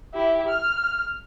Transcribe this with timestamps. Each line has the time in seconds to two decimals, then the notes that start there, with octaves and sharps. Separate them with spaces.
0.14 E4 G4
0.48 F6